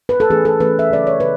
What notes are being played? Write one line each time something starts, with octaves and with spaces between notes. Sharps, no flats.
B4
A4
E3 A3 C#4 G#4
A4
E3 A3 C#4 B4
E5
C#3 F#3 C#4 D5
C#5
C#3 B4